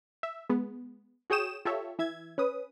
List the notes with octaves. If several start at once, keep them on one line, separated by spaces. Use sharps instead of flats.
E5
G#3 B3
F#4 G#4 C#5 G5 D#6 E7
F4 G4 A4 C#5 E5
E3 E5 G#6
C#4 B4 D#6